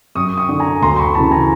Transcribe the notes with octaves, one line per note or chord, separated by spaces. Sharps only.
F#2 C#6 D#6
C#6 D#6
D3
G#5 A#5
D2 A#5 C6
B5 C#6
C#3 E3 A5 B5
G#5 A#5